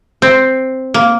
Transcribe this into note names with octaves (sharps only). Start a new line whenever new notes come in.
C4
A#3